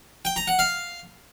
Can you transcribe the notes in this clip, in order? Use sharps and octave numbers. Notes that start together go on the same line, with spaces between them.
G5
A#5
F#5
F5